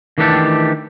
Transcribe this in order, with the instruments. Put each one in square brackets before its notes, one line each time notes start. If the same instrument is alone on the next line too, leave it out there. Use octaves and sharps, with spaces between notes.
[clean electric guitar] D#3 E3 A3 D4 G4 A4